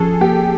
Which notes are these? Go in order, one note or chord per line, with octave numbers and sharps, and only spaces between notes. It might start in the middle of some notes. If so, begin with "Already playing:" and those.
Already playing: F3 C#4 G#4 A4
A#3 G4